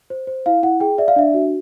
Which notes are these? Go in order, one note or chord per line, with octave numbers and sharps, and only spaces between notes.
C5
C5
E4 F5
E4 F#5
G#4 G5
D5 E5
F5
D4 E5
F#4